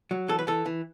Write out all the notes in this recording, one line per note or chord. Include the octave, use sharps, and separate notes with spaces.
F#3
E3 A4
B4
E3 A4
E3